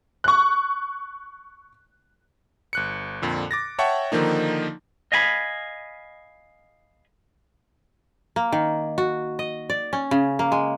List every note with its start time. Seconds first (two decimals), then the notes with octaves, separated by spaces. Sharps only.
0.24 C#6 F#6
2.73 G1 F#6 C#7
3.22 F2 A#2 D3
3.51 D6 A6 A#6
3.79 C#5 E5 F#5 G5 A5 C#6
4.12 D3 D#3 F3 A#3 D#4
5.12 D#5 F5 G#5 B5
8.36 A#3
8.52 D#3
8.98 F#4
9.39 D#5
9.70 D5
9.93 C#4
10.11 C#3
10.39 A#3
10.52 G#3